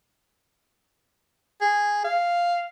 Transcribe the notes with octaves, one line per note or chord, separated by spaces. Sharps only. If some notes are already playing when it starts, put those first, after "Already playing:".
G#4
F5